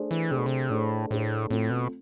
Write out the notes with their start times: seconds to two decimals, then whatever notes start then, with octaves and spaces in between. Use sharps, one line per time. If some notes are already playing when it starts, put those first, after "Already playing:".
Already playing: A3 D4 G#4 C5
0.11 E3
0.31 C3 A3 D4 G#4 C5
0.38 B2
0.46 C3
0.70 A2 A3 D4 G#4 C5
1.10 A2 A3 D4 G#4 C5
1.50 A2 A3 C4 F4 A4
1.70 B2